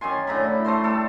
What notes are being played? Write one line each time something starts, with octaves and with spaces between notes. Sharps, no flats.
F#2 D#3 G#5 C6
A2 D3 A#5 B5
E4
A3 A4 C5 C6
G3 A4